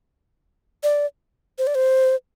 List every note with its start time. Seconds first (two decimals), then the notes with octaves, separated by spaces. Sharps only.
0.83 D5
1.58 C5
1.67 D5
1.75 C5